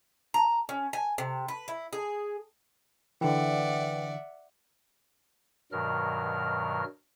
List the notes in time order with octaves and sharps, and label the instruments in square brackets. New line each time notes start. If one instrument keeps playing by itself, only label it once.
[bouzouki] A#5
C#4
G#5
C3
B4
E4
G#4
[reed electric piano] D3 E3 [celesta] B4 G5 [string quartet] D5 E5 F#5
[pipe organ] G2 B2 D#3 F#3 A#4 F6